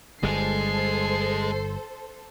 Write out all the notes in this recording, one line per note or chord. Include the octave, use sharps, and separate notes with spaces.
G1 G3 G#3 G#4 A4 C5 C7